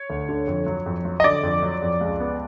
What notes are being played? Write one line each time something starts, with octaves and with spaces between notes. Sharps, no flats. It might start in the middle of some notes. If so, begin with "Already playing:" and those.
Already playing: C#5
D2
D3
F2
F#3
F2
F#3
D#5
D3 D5
F2
F#3
F2
C#2
B3